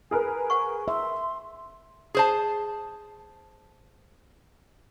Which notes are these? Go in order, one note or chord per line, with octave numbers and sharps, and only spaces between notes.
G#4 A#4 B4 G#5
C5 F#5 C#6
E5 C6
G#4 C5 A5